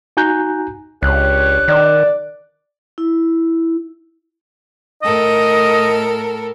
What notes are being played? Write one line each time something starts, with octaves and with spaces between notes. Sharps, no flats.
D#4 F#4 G#5 A#5 F#6 G6
C#2 D4 G4 C#5 F#6
D#3 D5
E4
A2 A4 A#4 D#5